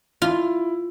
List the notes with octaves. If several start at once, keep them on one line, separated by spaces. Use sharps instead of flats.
E4 F4